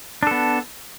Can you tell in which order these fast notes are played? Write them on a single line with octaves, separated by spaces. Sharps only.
D4 A4 B3